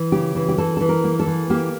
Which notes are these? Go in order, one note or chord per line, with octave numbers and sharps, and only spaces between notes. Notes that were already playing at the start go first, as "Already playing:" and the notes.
Already playing: E3
C#3 G4
E3
G4
E3 A4
E3 A4
A#4
A#3
A4
E3
A#3 G4